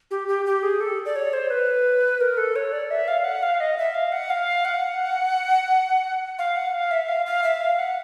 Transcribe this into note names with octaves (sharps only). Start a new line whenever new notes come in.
G4
G4
G4
G#4
A4
D5
C#5
C5
B4
A#4
A4
C#5
D5
E5
F5
F#5
F5
D#5
E5
F5
F#5
F5
F#5
F5
F#5
F5
E5
F5
F5
E5
F5
F#5